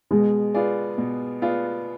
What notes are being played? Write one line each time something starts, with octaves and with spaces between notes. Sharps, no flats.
B2 G#3
B3 F4 G#4 D5
B2
B3 F4 G#4 D5